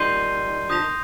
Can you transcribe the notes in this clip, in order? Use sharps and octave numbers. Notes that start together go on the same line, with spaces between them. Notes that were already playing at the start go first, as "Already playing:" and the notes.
Already playing: D#3 G3 C6 G6 C7 D#7 G7
D3 F3 D#6 G6 A#6 F7
D#3